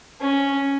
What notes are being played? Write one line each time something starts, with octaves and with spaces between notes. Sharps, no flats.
C#4